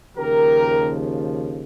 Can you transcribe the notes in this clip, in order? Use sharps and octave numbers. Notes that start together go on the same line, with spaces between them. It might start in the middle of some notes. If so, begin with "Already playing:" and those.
D#2 C#3 F3 G4 A#4